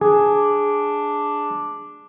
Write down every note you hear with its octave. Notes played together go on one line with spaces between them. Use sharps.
D4 G#4